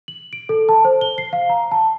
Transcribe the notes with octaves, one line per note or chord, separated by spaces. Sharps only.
F#7
D7
A4
A5
C5
G7
C7
F5
A#5
A5